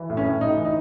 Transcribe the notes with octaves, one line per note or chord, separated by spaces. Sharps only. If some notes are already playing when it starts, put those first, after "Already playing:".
Already playing: E3
A2
C#4
A2
A2 D#4
E3
D#4